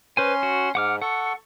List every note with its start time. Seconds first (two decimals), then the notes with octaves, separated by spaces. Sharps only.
0.17 C#4 B4 C5 G#5 C6
0.43 F#4
0.75 G#2 F#5 D6 F6
1.02 A4 F#5 C#6